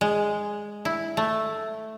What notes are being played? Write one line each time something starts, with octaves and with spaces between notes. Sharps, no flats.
G#3
E4
A3